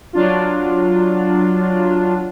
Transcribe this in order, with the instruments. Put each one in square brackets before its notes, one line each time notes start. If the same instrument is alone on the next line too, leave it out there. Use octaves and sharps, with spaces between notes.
[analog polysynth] F#3 D4 F4